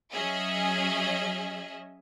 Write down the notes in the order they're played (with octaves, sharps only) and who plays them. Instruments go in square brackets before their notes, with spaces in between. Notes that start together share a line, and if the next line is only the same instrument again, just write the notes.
[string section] F#3 C#4 G#4 D#5 E5